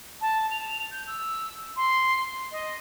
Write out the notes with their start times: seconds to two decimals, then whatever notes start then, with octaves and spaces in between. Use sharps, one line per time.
0.21 A5
0.51 F7
0.91 G6
1.07 E6
1.77 C6
2.52 D#5